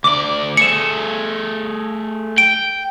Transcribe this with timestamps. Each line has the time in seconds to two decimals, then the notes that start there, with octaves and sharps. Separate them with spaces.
0.04 D2 D5 D6
0.57 A3 G#4 C#7 E7
2.38 G5 D7